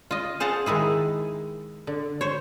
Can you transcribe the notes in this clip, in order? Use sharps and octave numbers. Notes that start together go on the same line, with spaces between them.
F4 D#5
G#4 C5 F5 F#5 A5
D#3 G#3 E4 G#4
D3
C5 C#5